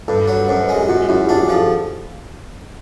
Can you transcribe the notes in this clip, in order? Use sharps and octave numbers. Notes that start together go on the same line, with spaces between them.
G2 A4 B4
F#3
F#2 A#4 C5
B4 C#5
G#3
G#4 A#4
G4
F#2 F#4 G#4
F#2 E4 F#4
G4
D4 F#4 G#4
F#4 G#4
F3
G4 A4